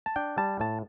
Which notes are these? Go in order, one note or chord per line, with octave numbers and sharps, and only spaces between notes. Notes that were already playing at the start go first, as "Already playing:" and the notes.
A5
D4 G5
G3 A5
A2 A5